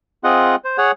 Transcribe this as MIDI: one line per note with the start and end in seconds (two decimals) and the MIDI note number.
0.24 0.56 60
0.24 0.56 65
0.24 0.56 68
0.24 0.56 75
0.24 0.56 78
0.64 0.77 72
0.78 0.91 68
0.78 0.91 73
0.78 0.91 78